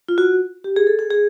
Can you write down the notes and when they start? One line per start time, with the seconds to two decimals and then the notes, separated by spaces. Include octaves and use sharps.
0.09 F4
0.18 F#4
0.64 G4
0.76 G#4
0.87 A4
0.99 G#4
1.11 G#4